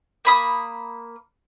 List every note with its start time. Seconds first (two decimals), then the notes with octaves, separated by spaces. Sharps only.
0.25 A#3 B5 D#6